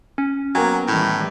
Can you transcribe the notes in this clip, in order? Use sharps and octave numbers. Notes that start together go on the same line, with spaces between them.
C#4
F#3 A#3 B3 G5 G#5
A2 D#3 E3 G3